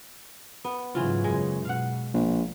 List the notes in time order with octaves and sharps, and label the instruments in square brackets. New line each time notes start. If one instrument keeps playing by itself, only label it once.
[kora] B3
[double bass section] G#2 C#3 F#3 [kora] E3 F4
[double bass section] F#2 C#3 [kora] G#3
[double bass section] B2 [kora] F5 F#5
[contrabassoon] A#1